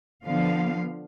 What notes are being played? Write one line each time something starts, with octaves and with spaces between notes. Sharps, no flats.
D3 F3 B3 F5